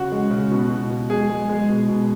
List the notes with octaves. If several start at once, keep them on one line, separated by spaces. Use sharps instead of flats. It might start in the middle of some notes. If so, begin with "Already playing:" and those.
Already playing: C#3 F#4
G#3
C#3
B2
B2
B2
G#3 G#4
G#3
G#3
B2
B2